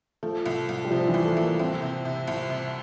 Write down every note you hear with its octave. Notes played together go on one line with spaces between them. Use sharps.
F3 A3
C2
C2
G3
C3 F3
E3
C2
A3
C2 A#3
C2 C4
C3
C3
C2
C3